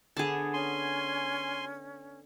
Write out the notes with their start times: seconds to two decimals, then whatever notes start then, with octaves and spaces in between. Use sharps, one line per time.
0.17 D3 B3 G#4 A5
0.54 C#4 G#5 C6